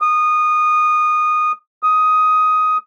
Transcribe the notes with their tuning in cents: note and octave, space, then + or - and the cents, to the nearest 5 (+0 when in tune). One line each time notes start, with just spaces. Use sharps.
D#6 -20
D#6 +10